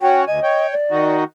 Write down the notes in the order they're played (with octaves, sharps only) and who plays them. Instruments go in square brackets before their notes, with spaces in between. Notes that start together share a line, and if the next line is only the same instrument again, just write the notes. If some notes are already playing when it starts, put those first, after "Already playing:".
[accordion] C#4 F#4 [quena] G5
[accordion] D2 G#5 [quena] D#5
[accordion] C#5 G5
[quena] D5
[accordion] D#3 D#4 F#4